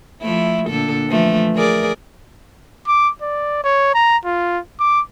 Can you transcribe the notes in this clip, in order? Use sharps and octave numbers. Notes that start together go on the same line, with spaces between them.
F3 A3 E4
A#2 D3 A4
E3 F3 A3
G#4 A#4 D5
D6
D5
C#5
A#5
F4
D6